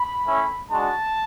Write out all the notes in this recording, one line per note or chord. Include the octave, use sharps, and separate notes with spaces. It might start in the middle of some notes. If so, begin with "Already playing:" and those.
Already playing: B5
A3 C#4 E4
G#3 D4 F#4 A5